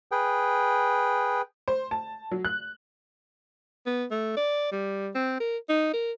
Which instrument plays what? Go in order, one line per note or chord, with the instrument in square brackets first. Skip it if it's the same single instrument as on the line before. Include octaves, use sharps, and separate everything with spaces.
[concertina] G#4 B4 G5
[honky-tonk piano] C5
A5
F#3
F#6
[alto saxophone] B3
A3
D5
G3
C4
A#4
D#4
A#4